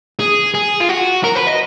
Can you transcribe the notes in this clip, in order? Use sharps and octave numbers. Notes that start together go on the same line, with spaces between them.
G#4
G#4
F4
F#4
A#4
B4
D#5